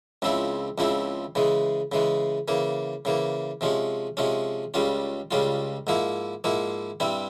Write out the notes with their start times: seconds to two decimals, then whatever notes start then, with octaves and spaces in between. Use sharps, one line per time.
0.22 C#2 C#3 F3 C4 E4
0.78 C#2 C#3 F3 C4 E4
1.35 C#3 E3 G#3
1.92 C#3 E3 G#3
2.48 C#3 E3 A#3
3.05 C#3 E3 A#3
3.61 C3 F3 G#3 C#4
4.17 C3 F3 G#3 C#4
4.74 C#2 C#3 G3 C#4 F4
5.31 C#2 C#3 G3 C#4 F4
5.87 G#2 F3 A#3 E4
6.44 G#2 F3 A#3 E4
7.00 G2 G3 C4 E4